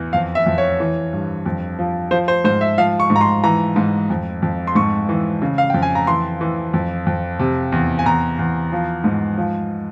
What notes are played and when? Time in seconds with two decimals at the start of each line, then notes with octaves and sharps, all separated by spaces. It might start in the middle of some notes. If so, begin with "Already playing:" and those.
Already playing: E2 E3
0.13 F2 F5
0.35 E5
0.46 F2
0.58 C#5
0.80 E3
1.13 G2
1.46 F2
1.79 F3
2.11 F3 C5
2.28 C5
2.44 G#2 C5
2.61 E5
2.78 F3 F5
3.00 C#6
3.10 G#2
3.16 A#5
3.21 C6
3.44 E3 A#5
3.76 G#2
4.10 F2
4.42 F2
4.67 C6
4.75 G#2 C#6
5.09 E3
5.42 C#3
5.58 F5
5.70 F2 G5
5.82 G#5
5.95 A#5
6.07 E3 C6
6.41 E3
6.73 F2
7.06 F2
7.39 C3
7.72 E2
7.99 G#5
8.05 E2 A#5
8.39 E2
8.72 F3
9.04 G#2
9.38 F3